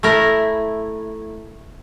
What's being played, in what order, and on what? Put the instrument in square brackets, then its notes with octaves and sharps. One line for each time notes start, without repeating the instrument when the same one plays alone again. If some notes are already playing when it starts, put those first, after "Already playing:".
[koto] A3 E4 A#4